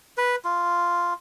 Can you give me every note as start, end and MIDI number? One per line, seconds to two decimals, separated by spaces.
0.18 0.36 71
0.45 1.14 65